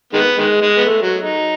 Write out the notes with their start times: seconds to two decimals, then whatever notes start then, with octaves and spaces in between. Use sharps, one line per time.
0.13 D#3 G#3 B3
0.38 D#3 G#3
0.61 G#3
0.77 B3
0.86 A3
1.02 F#3
1.19 D#4